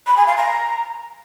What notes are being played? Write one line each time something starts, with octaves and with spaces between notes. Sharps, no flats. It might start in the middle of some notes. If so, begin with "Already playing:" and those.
B5
G#5
F5
A#5